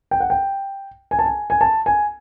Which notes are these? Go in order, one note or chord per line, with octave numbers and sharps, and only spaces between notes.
G5
F#5
G5
G#5
A5
G#5
G#5
A5
G#5